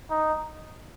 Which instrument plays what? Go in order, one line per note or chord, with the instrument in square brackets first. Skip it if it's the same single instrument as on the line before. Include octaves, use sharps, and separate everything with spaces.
[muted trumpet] D#4